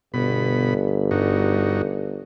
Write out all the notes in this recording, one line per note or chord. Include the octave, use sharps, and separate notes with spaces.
G1 B2 B5
G2 D#4 F#4